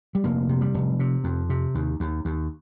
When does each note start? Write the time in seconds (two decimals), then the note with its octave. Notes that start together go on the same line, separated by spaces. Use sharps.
0.15 G3
0.24 F1 A#3
0.49 C3
0.61 G3
0.74 F1
0.99 C3
1.24 F2
1.50 C3
1.75 D#2
2.00 D#2
2.25 D#2